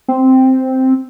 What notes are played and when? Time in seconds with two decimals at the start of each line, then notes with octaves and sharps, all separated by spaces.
0.08 C4